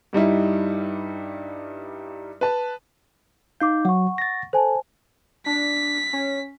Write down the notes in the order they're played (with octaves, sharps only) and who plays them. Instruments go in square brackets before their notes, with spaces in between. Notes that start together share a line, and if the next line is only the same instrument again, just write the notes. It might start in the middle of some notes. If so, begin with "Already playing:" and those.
[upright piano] G2 G3 D#4 E4
B4 A5
[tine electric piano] D#4 G6 [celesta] F5 D6
[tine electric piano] F#3 [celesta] F#5 C#6
[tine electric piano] A6 A#6
[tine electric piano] A4 [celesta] C5 G#5 A5
[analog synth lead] D4 [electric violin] B6
[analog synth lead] C#4